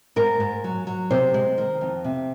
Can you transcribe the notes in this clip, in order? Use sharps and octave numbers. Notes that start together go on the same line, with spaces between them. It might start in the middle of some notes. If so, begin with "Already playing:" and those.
G#2 A#4
G#2
F#3
F#3
C3 C5
G#3
D#3
F2
C3